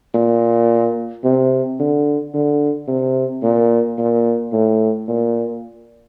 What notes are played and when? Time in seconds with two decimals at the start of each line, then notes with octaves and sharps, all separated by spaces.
0.14 A#2
1.24 C3
1.79 D3
2.34 D3
2.88 C3
3.43 A#2
3.98 A#2
4.52 A2
5.08 A#2